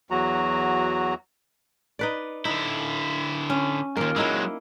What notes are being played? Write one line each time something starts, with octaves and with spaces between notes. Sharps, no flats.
E2 F#3 F#4 A#5
D#4 B4 D5
D3 D#4 E4
C#4
D#2 G#2 A#3 F4
F#3 G#3 A#3 D#4 E4